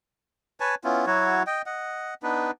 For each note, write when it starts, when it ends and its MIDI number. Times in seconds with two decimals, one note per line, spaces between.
0.60 0.75 71
0.60 0.75 73
0.60 0.75 80
0.60 0.75 81
0.84 1.06 59
0.84 1.06 61
0.84 1.06 64
0.84 1.06 65
1.06 1.43 54
1.06 1.43 64
1.06 1.43 66
1.06 1.43 73
1.47 1.62 75
1.47 1.62 79
1.66 2.14 75
1.66 2.14 78
2.23 2.51 59
2.23 2.51 62
2.23 2.51 63
2.23 2.51 71